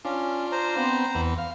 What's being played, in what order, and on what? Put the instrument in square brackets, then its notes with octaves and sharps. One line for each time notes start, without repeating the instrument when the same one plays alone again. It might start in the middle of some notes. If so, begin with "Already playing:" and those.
[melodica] C#4 [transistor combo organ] D4 F4
[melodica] C5 A#5
[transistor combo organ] B3 C4
E2 B3
F5